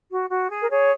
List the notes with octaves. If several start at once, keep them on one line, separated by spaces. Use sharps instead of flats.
F#4
F#4
G#4
A#4
G#4 C#5